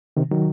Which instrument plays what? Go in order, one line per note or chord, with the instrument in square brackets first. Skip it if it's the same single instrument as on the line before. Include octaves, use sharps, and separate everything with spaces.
[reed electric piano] C3 D#3
D#3 F#3